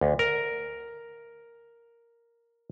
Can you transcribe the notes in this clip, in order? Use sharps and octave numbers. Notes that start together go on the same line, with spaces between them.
D2
A#4